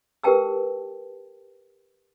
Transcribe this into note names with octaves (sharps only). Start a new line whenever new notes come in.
G4 A#4 B4 G5 A5 E6